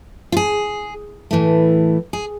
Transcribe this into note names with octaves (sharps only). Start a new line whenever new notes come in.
F4
G#4
A2 E3 A3
G#4